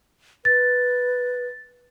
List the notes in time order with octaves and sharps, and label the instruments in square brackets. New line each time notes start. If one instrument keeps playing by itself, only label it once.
[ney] B4 [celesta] A6